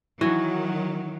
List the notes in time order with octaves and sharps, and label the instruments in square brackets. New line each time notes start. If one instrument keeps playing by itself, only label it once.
[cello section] D#3 F#3 [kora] E3 F#4